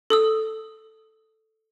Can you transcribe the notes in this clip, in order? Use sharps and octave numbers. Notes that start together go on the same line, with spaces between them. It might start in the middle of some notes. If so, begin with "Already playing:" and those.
A4 D#6 E6